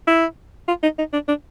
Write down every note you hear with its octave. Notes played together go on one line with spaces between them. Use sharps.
E4
F4
D#4
D#4
D4
D4